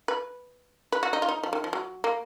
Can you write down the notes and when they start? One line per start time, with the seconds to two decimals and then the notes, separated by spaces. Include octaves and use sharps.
0.08 B4
0.92 B4
1.03 F#4
1.13 D#4
1.22 F4
1.28 D#4
1.43 F3
1.53 D#3
1.64 F3
1.73 F#3
2.04 A#3